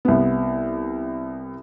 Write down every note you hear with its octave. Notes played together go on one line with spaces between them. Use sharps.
C2 B3